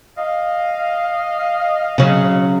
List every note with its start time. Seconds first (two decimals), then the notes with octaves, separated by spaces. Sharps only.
0.18 D#5 F5
1.98 C#3 F#3